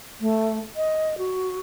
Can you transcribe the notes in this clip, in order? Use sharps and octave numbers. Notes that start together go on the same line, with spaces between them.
A3
D#5
F#4